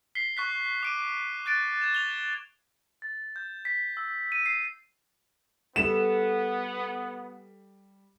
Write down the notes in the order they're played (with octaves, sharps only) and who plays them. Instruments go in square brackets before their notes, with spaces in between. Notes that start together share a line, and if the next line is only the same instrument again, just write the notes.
[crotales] B6 C7 G7
C#6 F#6 B6
D6 D7 D#7
F#6 A6 D7
G#6 E7
F7 G7
A6
G6
B6
E6
D#7
C7
[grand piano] G3 [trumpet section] B3 [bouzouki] A4 [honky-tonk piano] E7